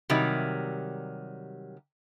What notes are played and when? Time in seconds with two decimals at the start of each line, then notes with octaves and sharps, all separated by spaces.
0.10 C3 D#3 F#3 G3